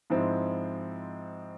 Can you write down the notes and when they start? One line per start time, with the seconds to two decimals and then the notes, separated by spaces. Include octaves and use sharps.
0.10 G#2 F3 G#3 C4 E4